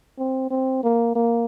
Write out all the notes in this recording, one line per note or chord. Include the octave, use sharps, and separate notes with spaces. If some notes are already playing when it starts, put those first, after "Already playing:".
C4
C4
A#3
A#3